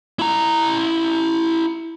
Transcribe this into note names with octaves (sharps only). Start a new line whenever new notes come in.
E4 A#5